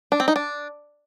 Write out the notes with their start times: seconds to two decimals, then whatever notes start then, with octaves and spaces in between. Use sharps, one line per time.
0.12 D4
0.20 C4
0.28 D#4
0.36 D4